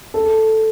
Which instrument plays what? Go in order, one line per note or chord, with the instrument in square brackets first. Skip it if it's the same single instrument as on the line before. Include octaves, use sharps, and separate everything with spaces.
[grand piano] A4